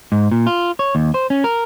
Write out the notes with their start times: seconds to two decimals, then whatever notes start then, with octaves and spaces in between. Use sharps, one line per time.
0.12 G#2
0.31 A#2
0.47 F4
0.79 C#5
0.95 D#2
1.14 C5
1.30 C#4
1.44 A#4